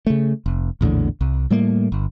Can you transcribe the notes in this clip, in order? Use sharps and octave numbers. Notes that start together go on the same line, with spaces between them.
C#3 A3
F1
A#1 E2 A2 D3
C2
A2 G3 A3 A#3
G1